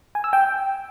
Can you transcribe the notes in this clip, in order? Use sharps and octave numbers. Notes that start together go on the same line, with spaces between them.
G#5
E6
G5